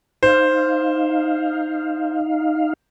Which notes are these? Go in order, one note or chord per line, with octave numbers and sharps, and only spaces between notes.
D#4 C5 F5